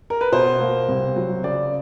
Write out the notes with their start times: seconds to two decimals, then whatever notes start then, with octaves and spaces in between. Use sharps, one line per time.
0.10 A#4
0.21 B4
0.32 B2 C5
0.60 A#3
0.88 C2
1.16 F#3
1.43 C#3 D5